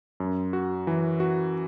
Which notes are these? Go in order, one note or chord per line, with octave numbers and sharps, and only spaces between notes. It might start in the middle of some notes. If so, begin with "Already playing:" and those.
F#2
F#4
E3
F#4